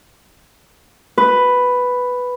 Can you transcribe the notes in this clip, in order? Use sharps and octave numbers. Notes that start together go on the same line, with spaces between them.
B4